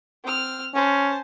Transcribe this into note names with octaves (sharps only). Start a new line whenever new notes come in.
C4 F6
C#4 C5 A5